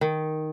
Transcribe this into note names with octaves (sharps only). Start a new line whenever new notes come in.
D#3